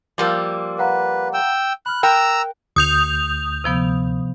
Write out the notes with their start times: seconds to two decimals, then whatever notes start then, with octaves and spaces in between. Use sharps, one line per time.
0.18 F3 G3 A#3 D6 E6
0.79 B4 F5 F#5 A#5
1.33 G5 E6
1.86 B5 F6 F#6
2.03 A#4 G5 A#5 E6 F#6
2.76 D2 D#6 G6 F7
3.64 C3 F3 B3